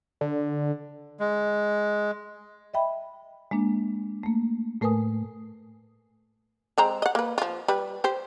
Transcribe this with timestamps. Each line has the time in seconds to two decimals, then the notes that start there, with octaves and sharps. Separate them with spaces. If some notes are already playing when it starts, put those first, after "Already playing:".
0.21 D3
1.20 G#3
2.74 D#5 E5 G5 B5
3.51 G#3 A#3 D4
4.23 A3 A#3
4.81 A2 A3 A#4 B4 G#5 D#6
6.78 G#3 C4 A#5
7.02 D#5 F#5
7.15 A#3 B4
7.38 F3 F4
7.68 G3 B4
8.04 G4 C5